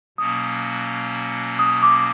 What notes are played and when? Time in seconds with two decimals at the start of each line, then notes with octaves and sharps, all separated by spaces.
0.18 B2 F#3 A#3 C#4 D#6
1.59 D#6
1.83 D6